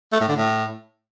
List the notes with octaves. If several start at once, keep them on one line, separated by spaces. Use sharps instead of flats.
A3
A2
D3
A2